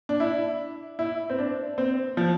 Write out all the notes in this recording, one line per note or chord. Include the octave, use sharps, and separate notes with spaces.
D4
E4
E4
C4
D4
C4
F3